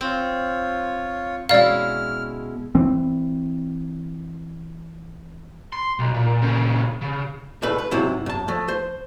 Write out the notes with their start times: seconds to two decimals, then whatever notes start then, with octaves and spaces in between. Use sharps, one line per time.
0.01 C4 F4 C#5
1.49 B2 G#3 C#4 E4 D5 F5 F6
2.75 E3 C4
5.73 C6
5.99 B1
6.14 A#2
6.42 A#2 C#3
7.02 C#3
7.62 C2 A2 G#3 A3 B4
7.78 B4
7.91 G#2 C3 F#3 E4
8.26 F#2 A5
8.48 F3 A3
8.68 C5